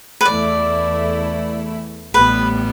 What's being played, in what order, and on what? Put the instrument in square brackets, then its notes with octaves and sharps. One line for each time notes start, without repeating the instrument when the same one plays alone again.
[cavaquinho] B4
[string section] E2 E3 A3 E4 [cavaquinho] D5
[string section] A1 A2 G3 B3 [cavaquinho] B4